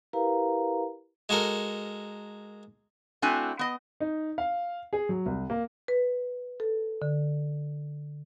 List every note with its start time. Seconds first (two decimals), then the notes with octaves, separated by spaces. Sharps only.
0.13 E4 G4 A#4 B4 F5 A#5
1.29 G#3 F#4 A4 A#4
3.22 A3 C4 D4 E4 F#4 G#5
3.59 B3 D#5
4.00 D#4
4.38 F5
4.93 G#4
5.09 F#3
5.26 C2
5.50 A#3
5.88 B4
6.60 A4
7.02 D3